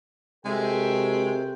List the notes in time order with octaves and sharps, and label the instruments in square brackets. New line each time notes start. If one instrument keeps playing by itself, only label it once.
[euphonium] C3 [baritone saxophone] G#3 [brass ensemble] F#4 A#4 G5 [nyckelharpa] A4 E5